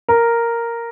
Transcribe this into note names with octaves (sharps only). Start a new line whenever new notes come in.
A#4